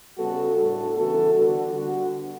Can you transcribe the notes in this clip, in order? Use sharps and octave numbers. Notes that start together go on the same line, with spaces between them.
C#3 G3 B3 F#4 A4
A2 G3 D4 F#4 A4
C#3 E3 B3 F#4 A4
D3 G3 B3 D4 F#4
D3 G3 B3 D4 F#4